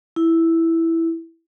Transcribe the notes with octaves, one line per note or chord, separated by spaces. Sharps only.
E4